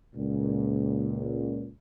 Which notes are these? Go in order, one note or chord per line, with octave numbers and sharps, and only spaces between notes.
C#2 A#2